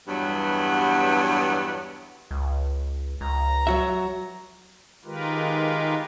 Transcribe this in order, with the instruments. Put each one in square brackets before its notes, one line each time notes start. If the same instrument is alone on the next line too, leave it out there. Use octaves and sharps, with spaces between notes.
[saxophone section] E2 G2 F#3 G3 B3
[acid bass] C#2
[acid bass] C#2 [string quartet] A#5
[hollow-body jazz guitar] F#3 F#4 E5
[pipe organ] D#3 G#3 F4 G4 A#4 B4